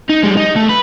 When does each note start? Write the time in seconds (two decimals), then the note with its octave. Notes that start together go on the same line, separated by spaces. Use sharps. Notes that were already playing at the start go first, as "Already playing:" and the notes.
0.10 D#4
0.24 G3 G#3
0.37 D#4
0.56 A3
0.69 B4